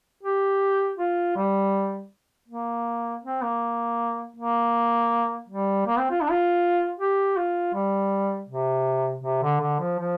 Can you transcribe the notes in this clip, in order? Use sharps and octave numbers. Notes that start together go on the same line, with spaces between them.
G4
F4
G3
A#3
C4
A#3
A#3
G3
A#3
C4
F4
D4
F4
G4
F4
G3
C3
C3
D3
D3
F3
F3